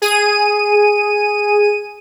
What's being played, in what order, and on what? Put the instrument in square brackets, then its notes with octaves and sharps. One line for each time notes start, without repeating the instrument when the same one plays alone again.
[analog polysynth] G#4 D#7